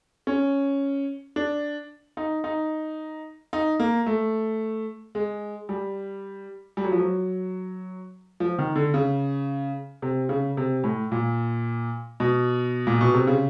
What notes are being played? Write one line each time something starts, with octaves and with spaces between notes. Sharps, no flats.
C#4
D4
D#4
D#4
D#4
A#3
A3
G#3
G3
G3
F#3
F3
F#3
F3
D#3
D3
C#3
C3
C#3
C3
A2
A#2
B2
A#2
B2
C3
C#3